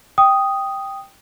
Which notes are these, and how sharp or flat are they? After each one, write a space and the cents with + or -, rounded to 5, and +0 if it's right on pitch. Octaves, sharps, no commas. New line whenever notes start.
G5 +0 D#6 +0